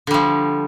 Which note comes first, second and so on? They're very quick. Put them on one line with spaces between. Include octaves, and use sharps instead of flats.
D3 G3 F3